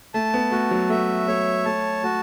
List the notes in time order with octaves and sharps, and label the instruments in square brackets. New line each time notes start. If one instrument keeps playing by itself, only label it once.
[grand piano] A3 [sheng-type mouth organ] A5
[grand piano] B3
[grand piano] A3 [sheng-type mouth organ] F#4
[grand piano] F#3
[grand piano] A3 [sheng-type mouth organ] E5
[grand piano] A3 [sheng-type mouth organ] C#5
[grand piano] A3 [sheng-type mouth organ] A5
[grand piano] A3 [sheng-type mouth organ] F#4